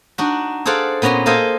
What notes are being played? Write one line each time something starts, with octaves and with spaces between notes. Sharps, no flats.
D4 D#4 F#4
G#4 A4 C5 D5 F5 F#5
A#2 B3 C#4 A#5 C6
A#3 G#4 A4 C5 D#5 F5